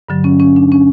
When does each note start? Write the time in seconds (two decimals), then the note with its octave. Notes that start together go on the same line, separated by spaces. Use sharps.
0.09 G2 D3 F#3
0.24 C#4
0.40 C#4
0.56 D4
0.72 C#4